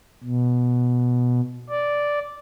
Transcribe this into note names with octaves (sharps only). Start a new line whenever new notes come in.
B2
D5